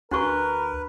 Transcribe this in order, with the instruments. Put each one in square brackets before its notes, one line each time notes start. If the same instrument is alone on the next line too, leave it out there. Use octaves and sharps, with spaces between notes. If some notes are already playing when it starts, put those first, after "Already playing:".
[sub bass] D2 [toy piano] D4 F#4 C#6 [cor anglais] A#4 [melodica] B4